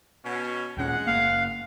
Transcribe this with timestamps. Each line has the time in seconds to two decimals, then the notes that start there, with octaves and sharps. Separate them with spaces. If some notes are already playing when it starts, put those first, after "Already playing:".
0.23 B2 C#4
0.77 D#2 A#2 G#3 C#4 F#5
1.07 F#1 A#3 F5